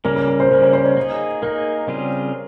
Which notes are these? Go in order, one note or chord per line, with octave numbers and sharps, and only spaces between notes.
C#3 G3 A#3 C#4 A#4
A#4
A#4
C5
C#3 G3 A#3 C#4 A#4
C5
C5
C#5
A#3 D#4 G#4
A#3 D#4 G#4 A#4
C#3 G3 C4 F4 G#4